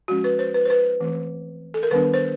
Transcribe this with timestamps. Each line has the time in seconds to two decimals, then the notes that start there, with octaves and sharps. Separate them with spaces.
0.08 F3 G#3 C#4 F#4
0.24 B4
0.39 C5
0.54 B4
0.65 C5
0.70 B4
1.00 E3 A3 C4
1.74 A4
1.83 A#4
1.91 D#3 G3 B3 D4 B4
2.14 C5